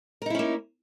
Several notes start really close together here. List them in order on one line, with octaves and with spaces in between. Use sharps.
A#4 D#4 E4 C#4 A#3